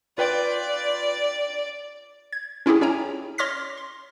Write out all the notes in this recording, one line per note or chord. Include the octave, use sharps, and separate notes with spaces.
F4 B4 D5 G5
G#6
C#4 E4 F4 G4 G#4
C#4 E4 C#5 G5 G#5 A#5
C#5 C6 D6 F6 A#6 B6
C6